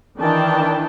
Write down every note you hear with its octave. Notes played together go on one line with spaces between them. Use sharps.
D#3 E3 D4 G5 A5